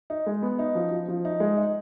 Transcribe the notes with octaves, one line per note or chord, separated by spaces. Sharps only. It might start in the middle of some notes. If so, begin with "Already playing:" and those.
D#4
G#3
B3
D#4
F3
F3
F3
D#4
G#3
D#4